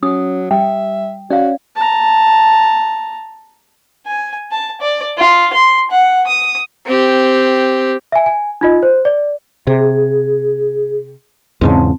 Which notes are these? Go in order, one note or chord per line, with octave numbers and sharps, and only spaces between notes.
F#3 C#4 D#6
G3 E5 G5
C#4 F#4 D5 F5
A5 A#5
G#5
A5
D5
F4
C6
F#5
D#6
C4 G4
E5 G#5
G#5
D#4 F4 D#5
C5
D5
C3 G#4
E2 G#2 C#3 C4 A5